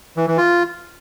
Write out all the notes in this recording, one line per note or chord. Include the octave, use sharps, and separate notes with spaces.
E3
E3
F4